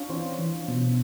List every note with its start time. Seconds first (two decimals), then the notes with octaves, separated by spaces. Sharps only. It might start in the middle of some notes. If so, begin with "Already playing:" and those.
Already playing: C#4 D4 F4 C#5 F5
0.09 E3 C4 C5
0.39 E3
0.68 B2